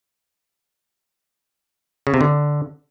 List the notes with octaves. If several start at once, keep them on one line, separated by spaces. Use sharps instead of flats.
C#3
C3
D3